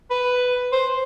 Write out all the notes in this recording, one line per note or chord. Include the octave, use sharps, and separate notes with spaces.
B4
C5